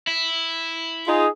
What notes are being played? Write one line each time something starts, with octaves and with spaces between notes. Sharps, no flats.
E4
D#4 F4 G#4